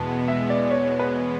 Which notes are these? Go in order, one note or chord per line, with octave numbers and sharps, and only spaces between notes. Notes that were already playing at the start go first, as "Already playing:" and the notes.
Already playing: E2 B2 G#3 B3 A5
E5
D5
C#5
B4